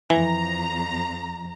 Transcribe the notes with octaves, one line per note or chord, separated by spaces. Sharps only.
F2 E3 A#5